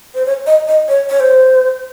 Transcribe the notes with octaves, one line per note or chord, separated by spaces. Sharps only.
C5
C#5
D#5
D#5
C#5
C#5
C5